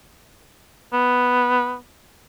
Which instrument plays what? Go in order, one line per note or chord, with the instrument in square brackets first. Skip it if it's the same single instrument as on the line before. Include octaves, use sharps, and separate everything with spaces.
[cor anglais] B3